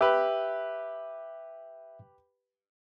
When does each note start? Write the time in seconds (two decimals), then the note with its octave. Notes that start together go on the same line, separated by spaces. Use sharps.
0.01 G4 B4 E5